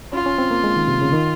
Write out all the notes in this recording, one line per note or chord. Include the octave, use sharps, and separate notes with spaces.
C#4 F4
C#4
C4
A#3
G#3
D#3
C3
C#3
D#3